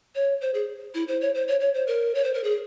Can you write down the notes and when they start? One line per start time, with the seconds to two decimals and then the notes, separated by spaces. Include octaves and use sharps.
0.15 C#5
0.41 C5
0.54 G#4
0.95 E4
1.08 C5
1.21 C#5
1.35 C5
1.48 C#5
1.60 C#5
1.75 C5
1.87 A#4
2.15 C#5
2.24 C5
2.34 A#4
2.44 G#4